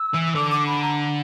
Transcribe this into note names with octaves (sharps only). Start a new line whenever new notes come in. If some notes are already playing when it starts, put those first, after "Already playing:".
Already playing: E6
E3
D3 D6
D6
B5
A#5